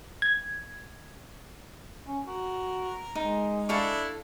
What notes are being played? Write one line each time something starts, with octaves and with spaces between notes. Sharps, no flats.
G#6
C#4
F#4 A#4
G#3 D#4
D4 E4 A4 F5 C#6